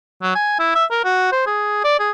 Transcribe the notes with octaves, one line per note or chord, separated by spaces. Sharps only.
F#3
G#5
E4
E5
A#4
F#4
C5
G#4
D5
G#4